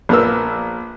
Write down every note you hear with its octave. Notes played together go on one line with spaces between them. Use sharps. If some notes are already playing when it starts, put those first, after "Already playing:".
A#1 B3 A#4 E6